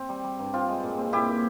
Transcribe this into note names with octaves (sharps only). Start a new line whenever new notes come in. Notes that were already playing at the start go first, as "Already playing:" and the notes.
Already playing: C4
G3
G3
G2
C4 F4
G#3
A#2
C4
A#2 E4 G4
A#2